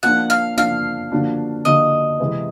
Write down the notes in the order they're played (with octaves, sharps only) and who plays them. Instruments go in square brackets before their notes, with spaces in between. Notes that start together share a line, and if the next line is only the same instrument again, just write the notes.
[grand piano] F3 A#3 D4 [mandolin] F#5
[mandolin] F5
[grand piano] F3 A#3 D4 [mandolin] F5
[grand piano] D3 F3 A#3 D4 F#4
[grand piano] D3 F3 A#3 D4 F#4 [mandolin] D#5
[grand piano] C3 E3 G#3 C4